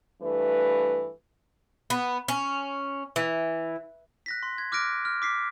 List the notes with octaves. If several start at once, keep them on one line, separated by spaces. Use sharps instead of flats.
G2 E3 A3 B4
B3
C#4
E3
F#6 A#6 B6
C6
G#6
D6 F6 F#6 A#6 D7
F6
D6 B6 C7